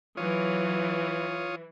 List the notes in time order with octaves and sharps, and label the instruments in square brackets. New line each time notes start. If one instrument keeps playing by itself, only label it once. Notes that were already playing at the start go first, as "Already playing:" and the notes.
[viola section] E3 [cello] F#3 [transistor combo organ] F4 C#5 D#6